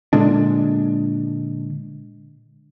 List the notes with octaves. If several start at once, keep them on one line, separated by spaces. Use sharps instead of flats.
A#2 D3 G#3 D4